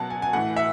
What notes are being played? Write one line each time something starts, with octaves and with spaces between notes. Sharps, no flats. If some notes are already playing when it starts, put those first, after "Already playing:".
Already playing: B2 F#3 F#5 A5
G#5
G#5
A2 E3 F#5
E5